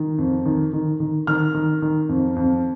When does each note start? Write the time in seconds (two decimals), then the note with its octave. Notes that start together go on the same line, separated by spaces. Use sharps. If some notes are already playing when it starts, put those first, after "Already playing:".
Already playing: D#3
0.18 F2
0.45 D#3
0.73 D#3
1.00 D#3
1.27 D#3 F6
1.54 D#3
1.82 D#3
2.09 F2
2.36 F2